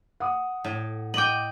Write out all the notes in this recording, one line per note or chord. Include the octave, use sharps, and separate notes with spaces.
F#5 D#6
A2
D#5 G5 D6 F#7